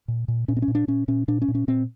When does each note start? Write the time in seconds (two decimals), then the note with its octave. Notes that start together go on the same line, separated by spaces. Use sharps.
0.08 A#2
0.28 A#2
0.48 A#2 C#4
0.57 C4
0.62 C#4
0.68 A#2
0.75 D4
0.88 A#2 C#4
1.08 A#2 C#4
1.28 A#2 D4
1.42 C#4
1.48 A#2
1.55 C#4
1.68 A#2 C4